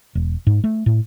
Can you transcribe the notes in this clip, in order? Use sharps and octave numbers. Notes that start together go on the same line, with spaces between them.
E1
G#2
A3
A2